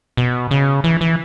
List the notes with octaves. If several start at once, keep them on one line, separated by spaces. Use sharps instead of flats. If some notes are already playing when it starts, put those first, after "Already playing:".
B2
C#3
E3
E3